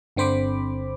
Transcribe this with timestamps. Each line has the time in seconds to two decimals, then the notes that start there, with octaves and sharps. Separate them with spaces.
0.16 G1 D3 C4 C5 B5 D6